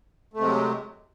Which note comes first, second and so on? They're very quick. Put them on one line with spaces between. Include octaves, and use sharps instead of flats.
A3 C3 G#3 F#3